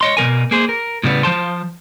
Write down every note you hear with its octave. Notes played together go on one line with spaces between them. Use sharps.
C#5 D#5 C6
B2 F#3 A#4 G#5
A#3 G#4 C5
A#4
A2 C#3 G3 B3
F3 C5 A5 C6